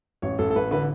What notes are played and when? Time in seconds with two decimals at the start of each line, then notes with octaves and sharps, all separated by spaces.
0.22 A1 C#5
0.39 A1 A4
0.50 A4
0.55 A1 B4
0.71 D3 B4